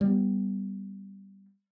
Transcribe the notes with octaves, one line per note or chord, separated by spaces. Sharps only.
G3 B3